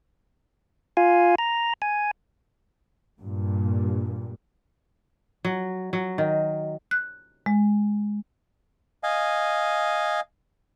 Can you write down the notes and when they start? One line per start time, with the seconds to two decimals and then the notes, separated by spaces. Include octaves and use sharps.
0.97 F4 F5 G#5
1.38 A#5
1.82 G#5
3.20 G2 A#2
5.45 F#3
5.93 F#3
6.18 D#3
6.91 F#6
7.46 G#3
9.03 D#5 F5 G#5